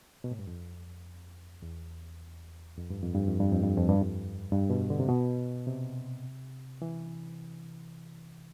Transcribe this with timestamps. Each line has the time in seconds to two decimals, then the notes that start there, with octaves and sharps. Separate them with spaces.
0.24 B2
0.31 A2
0.39 G2
0.47 F2
1.62 E2
2.78 F2
2.90 G2
3.03 F2
3.15 G2
3.28 F2
3.40 G2
3.52 F2
3.64 G2
3.77 F2
3.89 G2
4.01 F2
4.52 G2
4.70 B2
4.90 D3
5.00 C3
5.09 B2
5.67 C3
6.82 E3